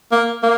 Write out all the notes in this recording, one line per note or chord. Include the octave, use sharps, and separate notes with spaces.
A#3
A#3